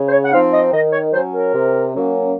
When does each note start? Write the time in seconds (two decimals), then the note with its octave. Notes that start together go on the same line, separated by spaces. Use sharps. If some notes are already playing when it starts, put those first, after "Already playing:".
Already playing: C#3
0.08 C5
0.12 C#5
0.25 F#5
0.33 F3 C4 D#4 F5
0.53 D#5
0.72 D#3 D#5
0.92 C#5
1.13 F#3 C#4 C5
1.33 A#4
1.54 C3
1.93 F#3 A#3 C#4